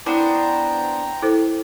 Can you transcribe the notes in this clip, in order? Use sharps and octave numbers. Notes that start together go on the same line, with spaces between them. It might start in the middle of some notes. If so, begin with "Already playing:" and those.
B3 D4 E4 C5 G5 A#5
E4 A4 C5